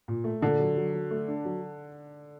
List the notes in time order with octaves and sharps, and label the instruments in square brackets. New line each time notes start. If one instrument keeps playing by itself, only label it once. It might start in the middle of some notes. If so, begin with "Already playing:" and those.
[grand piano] A#2
A3
[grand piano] A#2 [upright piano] D3
[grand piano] F#3
F#3
F#3
A3
D4
F#3